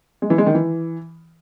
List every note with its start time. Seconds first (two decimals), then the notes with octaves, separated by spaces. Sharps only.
0.22 G#3
0.30 E3
0.38 G#3
0.46 D#3
0.54 E3